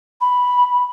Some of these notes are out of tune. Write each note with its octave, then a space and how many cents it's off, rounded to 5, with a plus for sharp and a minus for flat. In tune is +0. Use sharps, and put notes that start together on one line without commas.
B5 +0